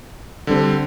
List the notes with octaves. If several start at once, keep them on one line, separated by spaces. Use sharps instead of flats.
D3 G3 C4